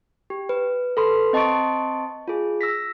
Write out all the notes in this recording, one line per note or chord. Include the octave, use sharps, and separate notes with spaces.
G4
B4
A4 B4 B5 C6
C4 D#5 A5 C6 C#6 D7
F4 G#4
E6 A#6 B6